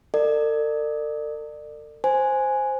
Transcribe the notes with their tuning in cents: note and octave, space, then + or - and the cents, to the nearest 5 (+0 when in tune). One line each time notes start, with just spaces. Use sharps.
A4 +45 D5 +30
C5 +0 G#5 +0